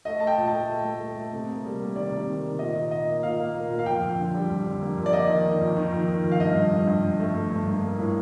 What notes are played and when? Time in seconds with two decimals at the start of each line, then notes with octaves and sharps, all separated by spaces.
0.05 A3 D#5
0.20 A3 A5
0.27 G5
0.38 A#2
0.48 A5
0.53 A3
0.69 A3
0.85 A3
1.01 A3
1.17 A3
1.33 C3
1.49 A#3
1.64 G3
1.80 A#3
1.96 D#3 D5
2.11 C3
2.28 D#3
2.44 D#3
2.59 A#2 D#5
2.75 A#2
2.91 A#3 D#5
3.07 A#3
3.23 A#2 F5
3.39 A#3
3.55 A#3
3.70 A#2
3.79 F5
3.86 F2 G5
4.02 F2
4.19 D3
4.34 G3
4.50 F2
4.66 D3
4.81 A#3
4.97 F2
5.06 D5
5.13 A#3 D#5
5.29 D#3
5.45 D#3
5.61 F2
5.77 D#3
5.92 F2
6.08 D#3
6.24 F2
6.32 F5
6.40 G2 D#5
6.55 G2
6.71 G2
6.87 G2
7.04 G2
7.20 A3
7.35 G2
7.51 G2
7.66 A#3
7.82 A#3
7.99 A2